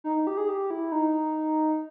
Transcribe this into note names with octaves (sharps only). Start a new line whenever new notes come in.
D#4
D#4
G4
G#4
G4
E4
D#4